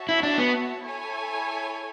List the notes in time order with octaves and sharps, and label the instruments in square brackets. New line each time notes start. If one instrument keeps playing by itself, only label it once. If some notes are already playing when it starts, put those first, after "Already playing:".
Already playing: [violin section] F#4 C#5 E5 A5
[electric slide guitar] E4
D4
B3
[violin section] E4 A4 C#5 G#5